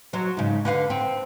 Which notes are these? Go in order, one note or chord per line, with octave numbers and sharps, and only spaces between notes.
F#3 C5
G#2 C#3
D3 B4 F5
C4